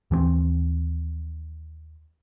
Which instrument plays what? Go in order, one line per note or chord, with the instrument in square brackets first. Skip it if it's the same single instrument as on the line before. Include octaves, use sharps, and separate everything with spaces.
[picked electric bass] D#2 E3 A3 C4